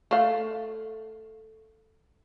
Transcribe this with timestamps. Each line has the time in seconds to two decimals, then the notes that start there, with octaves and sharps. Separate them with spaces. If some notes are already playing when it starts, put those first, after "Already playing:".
0.11 A3 F5